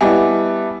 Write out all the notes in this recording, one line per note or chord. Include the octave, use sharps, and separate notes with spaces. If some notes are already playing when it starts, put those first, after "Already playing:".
G3 B3 E4 D#5 E5 G#5 A5 D6